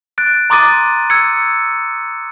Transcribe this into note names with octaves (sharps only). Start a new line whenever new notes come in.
F#6 A6 D7
A#5 C6 D6 D#6 A6 D#7
E6 G#6 C#7